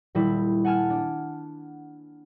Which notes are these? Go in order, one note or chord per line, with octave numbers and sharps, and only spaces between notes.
D#1 G3 E4
F#5 G#5 A5 F6 G#6
D4